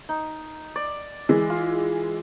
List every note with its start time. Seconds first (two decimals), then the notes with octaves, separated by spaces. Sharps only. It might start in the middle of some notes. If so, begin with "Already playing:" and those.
0.09 D#4
0.76 D5
1.29 E3 G#3
1.50 F4